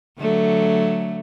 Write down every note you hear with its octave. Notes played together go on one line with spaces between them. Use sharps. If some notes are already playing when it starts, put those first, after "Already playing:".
D3 F#3 A3